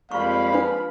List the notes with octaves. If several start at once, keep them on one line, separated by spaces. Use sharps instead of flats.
F2 F3 G3 G#3 A#3 F5 B5 C#6
D4 B4